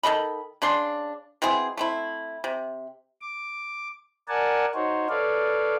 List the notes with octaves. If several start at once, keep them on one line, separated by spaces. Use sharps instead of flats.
D#3 A4 D#5 B5
C#3 D4 C6
B2 C4 E4 G#4
A3 C4 E4
C3
D6
A#4 D5 F#5 G#5 A5
D#4 F#4 C5 C#5
A4 B4 C#5 D5 F5